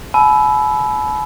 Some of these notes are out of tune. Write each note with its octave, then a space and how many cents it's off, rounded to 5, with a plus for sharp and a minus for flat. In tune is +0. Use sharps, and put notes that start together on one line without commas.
G#5 +45 B5 +0 E6 +0